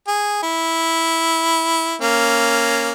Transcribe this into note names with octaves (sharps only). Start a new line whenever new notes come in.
G#4
E4
A#3 C#4